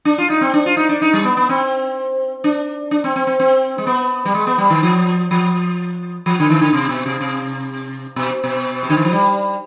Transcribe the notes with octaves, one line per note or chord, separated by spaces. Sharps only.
D4
F4
D#4
C4
D4
F4
D#4
D4
D#4
G3
B3
B3
C4
D4
D4
C4
C4
C4
C4
G#3
B3
G3
G#3
B3
G3
D#3
F3
F3
F3
D3
D#3
D3
C3
B2
C3
C3
B2
B2
C3
D3
D#3
F3
G3